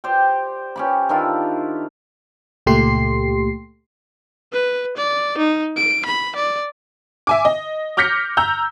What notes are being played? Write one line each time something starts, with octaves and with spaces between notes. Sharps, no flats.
G4 C5 D5 G5
C#4 G4 B5
D#3 D4 E4 F4
C#2 A#2 A3 G4 C6 C7
B4
D5
D#4
D7
B5
D5
E5 G#5 D6
D#5
D6 F6 G6 A#6 B6 C#7
A#5 E6 G6